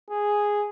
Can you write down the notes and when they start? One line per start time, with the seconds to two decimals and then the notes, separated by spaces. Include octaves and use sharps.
0.10 G#4